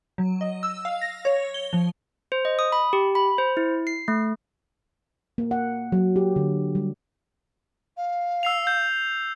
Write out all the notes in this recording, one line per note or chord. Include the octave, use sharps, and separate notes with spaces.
F#3
D#5
E6
F5
A#6
C#5
G7
F3
C5
D#5
D#6
B5
G4
B5
C5
E4
C7
A3
A#3
F#5
F#3
G4
D3
G3
F5
E6 C7 F7
G6